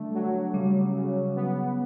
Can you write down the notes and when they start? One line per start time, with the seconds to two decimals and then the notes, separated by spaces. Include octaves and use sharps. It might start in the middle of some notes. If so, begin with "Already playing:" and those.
Already playing: D3 G3 A3
0.14 F#3
0.54 C#3 G3
0.95 C#3
1.35 B3